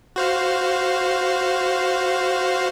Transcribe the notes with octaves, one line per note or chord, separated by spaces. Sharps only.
F#4 C5 F5